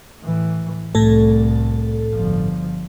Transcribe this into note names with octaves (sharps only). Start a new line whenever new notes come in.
A2 E3
C2 A2 A3 A4
G1 F3